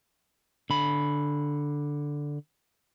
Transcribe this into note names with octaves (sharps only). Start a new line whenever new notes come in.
D3 B5